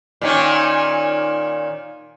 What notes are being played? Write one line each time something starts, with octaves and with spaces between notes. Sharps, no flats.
A#2 D#3 C#4